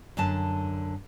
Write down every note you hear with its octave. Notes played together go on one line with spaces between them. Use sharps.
F#2 D3 A5